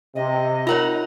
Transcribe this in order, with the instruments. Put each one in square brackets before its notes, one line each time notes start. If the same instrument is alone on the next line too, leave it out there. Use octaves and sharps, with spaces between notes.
[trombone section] C3 [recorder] D#5
[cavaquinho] D#4 F#5 A#5 [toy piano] F4 A#4 C#5